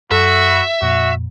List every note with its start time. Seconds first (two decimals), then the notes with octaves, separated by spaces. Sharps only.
0.12 F#2 F#4 A4 E5 B5
0.82 F2 A#2 F#4